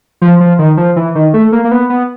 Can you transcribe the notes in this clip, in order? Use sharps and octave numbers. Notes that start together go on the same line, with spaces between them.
F3
F3
D#3
F3
E3
D#3
A3
A#3
A#3
B3
B3